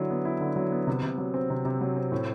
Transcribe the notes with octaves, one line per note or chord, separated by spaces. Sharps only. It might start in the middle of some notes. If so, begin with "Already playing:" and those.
Already playing: D3 F#3 E4
B3
E4
D3
F#3
B3
C3
C3
F#3
C4
C3
C3
F#3
C4
A2